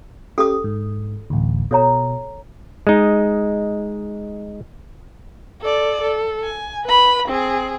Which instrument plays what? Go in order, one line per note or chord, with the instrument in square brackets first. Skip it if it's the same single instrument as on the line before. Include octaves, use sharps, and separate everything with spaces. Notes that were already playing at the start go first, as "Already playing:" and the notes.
[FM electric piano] C#4 G4 [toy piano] A4 D#6
[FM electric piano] G#2
A1 D2
[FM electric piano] B2 [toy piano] A4 C#5 A#5
[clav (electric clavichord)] G#3 D#4
[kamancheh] A4 D5
A4
G#5
B4 B5
C4 G#4